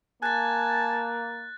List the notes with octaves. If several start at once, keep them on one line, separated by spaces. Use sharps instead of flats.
A#3 G#5 A5 F#6 A6